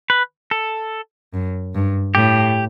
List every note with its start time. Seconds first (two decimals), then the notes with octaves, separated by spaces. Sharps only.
0.10 B4
0.51 A4
1.33 F#2
1.74 G2
2.15 A2 G4